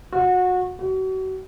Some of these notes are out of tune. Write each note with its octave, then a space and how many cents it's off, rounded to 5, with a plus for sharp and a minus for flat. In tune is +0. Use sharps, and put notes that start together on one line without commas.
F#4 -25
F#4 +35